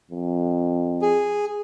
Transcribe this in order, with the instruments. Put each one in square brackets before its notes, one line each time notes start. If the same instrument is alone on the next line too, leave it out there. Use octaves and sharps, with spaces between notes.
[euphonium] F2
[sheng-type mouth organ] G#4